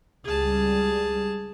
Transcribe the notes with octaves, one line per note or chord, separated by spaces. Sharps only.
C#2 G3 G#4 A5